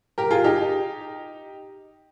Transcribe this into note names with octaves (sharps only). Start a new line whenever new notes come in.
G4 A#4
F4 G#4
D#4 G4